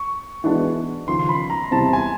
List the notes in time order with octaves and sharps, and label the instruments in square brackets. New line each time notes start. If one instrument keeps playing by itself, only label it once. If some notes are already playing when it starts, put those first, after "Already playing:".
Already playing: [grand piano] C#6
[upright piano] E3 G#3 B3 D4 F#4
[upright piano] D#2 C#3 F3 [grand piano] C6
[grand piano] C6
B5
A#5
[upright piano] E2 C3 E3 G3 C4 [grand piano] A5
[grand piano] G#5